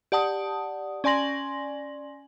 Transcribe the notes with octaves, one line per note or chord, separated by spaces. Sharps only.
G4 D5 F#5 A5 D#6
C#4 D5 G#5 C6 A#6 F#7